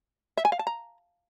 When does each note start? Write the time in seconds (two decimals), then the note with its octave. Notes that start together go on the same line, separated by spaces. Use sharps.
0.37 E5
0.45 G#5
0.52 F5
0.59 A5
0.67 A#5